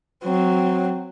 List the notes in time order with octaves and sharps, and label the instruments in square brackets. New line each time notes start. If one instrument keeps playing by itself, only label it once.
[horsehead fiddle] F#3 C4